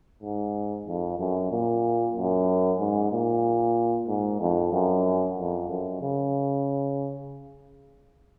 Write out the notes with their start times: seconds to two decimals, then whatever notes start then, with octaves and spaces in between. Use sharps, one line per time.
0.23 G#2
0.87 F2
1.19 F#2
1.51 A#2
2.16 F#2
2.80 G#2
3.12 A#2
4.08 G#2
4.41 F2
4.72 F#2
5.38 F2
5.69 F#2
6.01 C#3